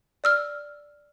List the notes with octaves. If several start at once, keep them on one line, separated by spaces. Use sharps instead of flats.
D5 E6 F6